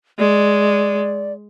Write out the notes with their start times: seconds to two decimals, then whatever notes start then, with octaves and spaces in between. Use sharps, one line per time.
0.19 G#3 D5